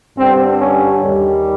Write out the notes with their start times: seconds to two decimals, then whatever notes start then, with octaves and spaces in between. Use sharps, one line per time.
0.17 G2 D3 G3 C4
0.60 C#4
1.03 D#2 D#3 G3